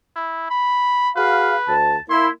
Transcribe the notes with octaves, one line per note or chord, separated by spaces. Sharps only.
E4
B5
F#4 G#4 B4 F5
D2 A5
A#3 E4 C6